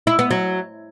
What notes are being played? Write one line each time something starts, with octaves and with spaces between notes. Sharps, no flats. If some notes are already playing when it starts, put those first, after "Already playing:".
E4
B3
F#3